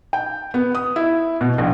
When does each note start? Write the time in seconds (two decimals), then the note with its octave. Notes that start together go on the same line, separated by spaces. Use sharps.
0.13 G5
0.54 B3
0.75 D#6
0.96 E4
1.41 B2
1.58 A#1